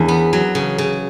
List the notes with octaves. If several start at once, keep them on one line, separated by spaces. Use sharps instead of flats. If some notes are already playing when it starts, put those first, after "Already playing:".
Already playing: E2 A#3 C#4 D4
B3
F#3
C#3
C#3